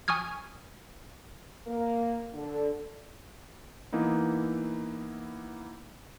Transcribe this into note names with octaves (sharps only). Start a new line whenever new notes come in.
G#5 C#6 D#6 F6 G#6
A#3
D3
E3 A#3 B3 D#4 E4